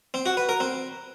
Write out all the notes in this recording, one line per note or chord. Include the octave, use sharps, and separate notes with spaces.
C4
F#4
B4
A#4
C4